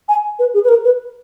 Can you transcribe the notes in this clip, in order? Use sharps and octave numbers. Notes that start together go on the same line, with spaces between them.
G#5
B4
G#4
B4
A#4
B4